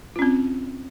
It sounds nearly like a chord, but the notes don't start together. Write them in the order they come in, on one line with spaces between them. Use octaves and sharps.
F4 C#4 C4